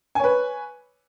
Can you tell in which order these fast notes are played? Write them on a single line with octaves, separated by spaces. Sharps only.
G#5 C#5 B4